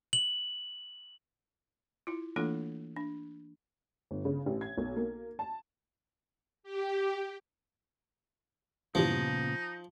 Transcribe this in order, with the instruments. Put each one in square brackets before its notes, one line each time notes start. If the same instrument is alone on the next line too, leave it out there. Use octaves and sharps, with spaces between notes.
[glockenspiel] F#7
[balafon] E4 F4
E3 A3 A#3 D4 F4 A4
D4
[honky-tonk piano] G1
C#3
A1
G#6
B1
A#3
A5
[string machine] G4
[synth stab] G2 E3 G3 [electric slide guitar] A#2 C#3 B3 [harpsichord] F3 [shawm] D#4